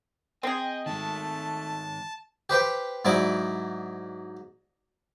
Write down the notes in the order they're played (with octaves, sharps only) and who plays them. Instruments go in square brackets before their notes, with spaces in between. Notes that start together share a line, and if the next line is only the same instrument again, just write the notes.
[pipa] C4 G#4 [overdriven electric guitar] D#5 [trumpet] G5
[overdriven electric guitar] D#3 G#3 [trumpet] A3 [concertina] A5
[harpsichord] G4 B4 C5 G5
G#2 F#3 E4 D5 D6